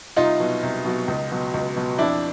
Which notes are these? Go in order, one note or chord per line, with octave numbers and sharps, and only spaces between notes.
C2 D#4 F4
B2 F#3
C2
B2 F#3
C#2
B2 F#3
C#2
B2 F#3
F2 D4 E4